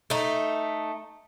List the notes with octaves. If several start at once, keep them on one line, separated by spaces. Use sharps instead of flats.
A3 D#4